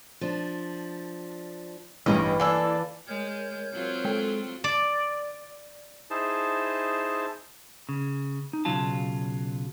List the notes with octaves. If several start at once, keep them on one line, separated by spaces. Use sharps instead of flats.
F3 D4
A1 G2 E3 C#4 D#4 A#4
A#3 D4 A4 G#5 E6
G#3 A#4 C#5 G6
F#3 C4 F4
G#3 A4 G5
D5
D#4 E4 G#4 C5 A5
C#3
D#4
B1 C#3 F#3 F4 A5